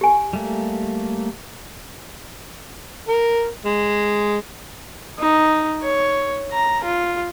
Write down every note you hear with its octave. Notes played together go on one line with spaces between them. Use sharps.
G4 G#5
G3 A3 A#3
A#4
G#3
D#4
C#5
A#5
F4